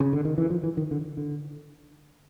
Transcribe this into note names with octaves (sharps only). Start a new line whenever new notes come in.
C#3
D3
D#3
E3
F3
E3
D#3
D3
D3